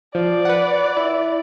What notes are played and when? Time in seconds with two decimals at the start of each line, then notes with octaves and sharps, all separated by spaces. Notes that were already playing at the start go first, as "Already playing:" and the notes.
0.15 F3 D5
0.45 B4 F#5
0.97 E4